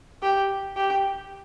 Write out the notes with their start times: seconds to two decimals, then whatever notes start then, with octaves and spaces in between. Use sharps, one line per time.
0.23 G4
0.76 G4